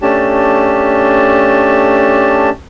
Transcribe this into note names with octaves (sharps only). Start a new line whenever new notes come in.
A3 C#4 D4 G4 A5